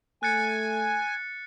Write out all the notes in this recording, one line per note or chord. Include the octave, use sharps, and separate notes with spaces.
A3 G#5 F#6 A6 C#7